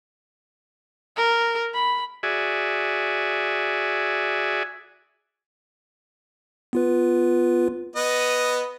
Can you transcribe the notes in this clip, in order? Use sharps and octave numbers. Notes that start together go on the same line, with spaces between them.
A#4
B5
F#4 G#4 D5 E5 G#5
B3 F4 B4
B3 B4 D#5